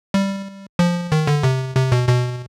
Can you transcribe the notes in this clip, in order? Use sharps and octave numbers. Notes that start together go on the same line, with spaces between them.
G3
F3
D#3
D3
C3
C3
B2
B2